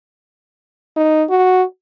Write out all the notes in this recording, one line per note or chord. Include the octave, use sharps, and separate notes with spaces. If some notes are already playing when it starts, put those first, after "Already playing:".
D#4
F#4